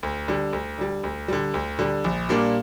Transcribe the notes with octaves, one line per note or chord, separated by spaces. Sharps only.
D2
D3 G3
D2
D3 G3
D2
D3 G3
D2
D3 G3
A#1
A#2 G3 A#3 D4